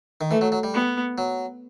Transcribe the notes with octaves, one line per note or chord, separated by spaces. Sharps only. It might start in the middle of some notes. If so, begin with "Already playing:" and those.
D#3
E3 A3
F#3
F#3
G3
B3
F#3